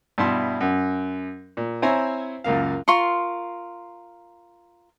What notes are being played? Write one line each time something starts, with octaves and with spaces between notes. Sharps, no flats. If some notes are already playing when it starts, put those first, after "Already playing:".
G2 B2 E4 E5 C6
F#2
A#2
C4 E4 C5 C#5 G#5 A#5
C#2 F#2 A#3 F5
F4 A#4 C6 C#6